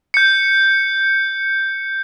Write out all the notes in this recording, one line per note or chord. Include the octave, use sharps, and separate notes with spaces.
G6 C#7